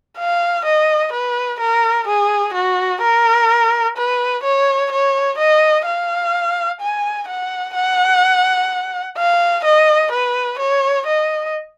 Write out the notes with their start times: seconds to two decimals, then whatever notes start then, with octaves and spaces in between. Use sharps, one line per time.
0.18 F5
0.65 D#5
1.12 B4
1.60 A#4
2.08 G#4
2.54 F#4
3.01 A#4
3.97 B4
4.43 C#5
4.92 C#5
5.38 D#5
5.86 F5
6.81 G#5
7.28 F#5
7.75 F#5
9.17 F5
9.64 D#5
10.12 B4
10.59 C#5
11.07 D#5